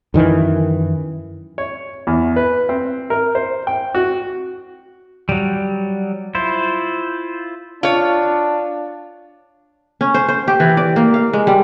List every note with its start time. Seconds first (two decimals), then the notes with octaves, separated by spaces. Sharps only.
0.14 F#2 D#3 E3
1.58 C#5
2.07 E2
2.36 B4
2.69 C4
3.10 A#4
3.35 C5
3.67 G5
3.95 F#4
5.29 F#3 G3
6.35 E4 F4 C5
7.83 D4 F4 C#5
10.01 C#4
10.14 C5
10.28 C5
10.48 G4
10.60 E3
10.77 D5
10.96 A#3
11.14 F5
11.33 G#3
11.47 G3